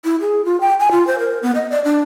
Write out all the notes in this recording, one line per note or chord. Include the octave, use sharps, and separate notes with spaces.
E4
G#4
F4
G5
G#5
F4
C5
A#4
B3
D#5
D5
D4